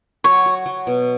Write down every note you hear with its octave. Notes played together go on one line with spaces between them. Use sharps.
F#3 C#5
F#4
F#3
B2